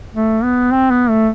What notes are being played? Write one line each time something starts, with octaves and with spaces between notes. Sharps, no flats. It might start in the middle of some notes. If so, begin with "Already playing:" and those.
A3
B3
C4
B3
A3